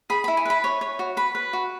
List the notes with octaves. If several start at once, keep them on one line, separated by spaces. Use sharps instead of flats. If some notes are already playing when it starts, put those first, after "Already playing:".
G#4 B5
E4 B5
G#5
B4 B5
C#5
C#5
F#4
B4 B5
B4
F#4